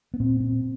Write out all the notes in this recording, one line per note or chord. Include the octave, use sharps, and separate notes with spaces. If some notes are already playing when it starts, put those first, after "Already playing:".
B3
A#2 C4
C4